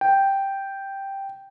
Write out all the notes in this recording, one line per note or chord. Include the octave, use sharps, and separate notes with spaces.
G5